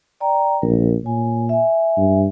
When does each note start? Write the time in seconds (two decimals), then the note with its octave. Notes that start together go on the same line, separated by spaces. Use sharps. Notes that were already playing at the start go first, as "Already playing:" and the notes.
0.20 D5 G5 A#5
0.62 A#1 A#4
1.04 A#2 C#5 G#5
1.49 E5 G#5
1.98 G2